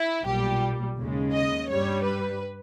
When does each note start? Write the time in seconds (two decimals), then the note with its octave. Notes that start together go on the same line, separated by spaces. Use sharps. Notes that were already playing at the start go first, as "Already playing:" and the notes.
Already playing: E4
0.26 B1 A#2 G3 G4
0.97 D#2 C#3 G#3
1.33 D#5
1.69 G2 G3 C#5
2.05 B4